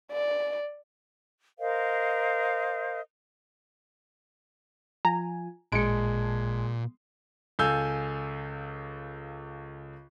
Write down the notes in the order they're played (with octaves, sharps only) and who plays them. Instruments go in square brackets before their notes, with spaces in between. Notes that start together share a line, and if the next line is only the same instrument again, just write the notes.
[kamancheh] D5
[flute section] A#4 C5 D#5 F5
[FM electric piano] F3 F4 G#5 [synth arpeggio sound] A#5
[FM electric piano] A1 A5 [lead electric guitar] A#2 [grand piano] G#3 [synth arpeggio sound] C#7 D7
[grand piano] C#2 A4 F5 G#5 E6 G6